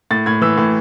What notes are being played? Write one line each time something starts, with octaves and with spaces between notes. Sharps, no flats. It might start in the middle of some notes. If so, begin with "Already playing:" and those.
A2 A6
A2 G#6
E3 E6
A2